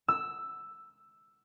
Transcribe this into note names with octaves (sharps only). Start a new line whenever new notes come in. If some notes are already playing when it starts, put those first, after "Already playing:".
E6